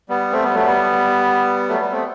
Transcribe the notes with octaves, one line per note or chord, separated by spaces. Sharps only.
G3 B3
A3 C4
G3 B3
F#3 A3
G3 B3
F#3 A3
G3 B3
A3 C4